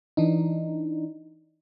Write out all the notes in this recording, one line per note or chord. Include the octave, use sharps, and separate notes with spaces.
E3 D4 D#4